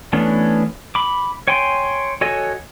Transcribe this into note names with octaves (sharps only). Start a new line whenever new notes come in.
E3 A3 B3 C#4 D4
B5 D6
C#5 G5 G#5 C6
F#4 A4 C#5 D#5 G#5